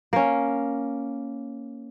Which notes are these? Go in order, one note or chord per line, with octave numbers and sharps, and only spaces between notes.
A#3 C#4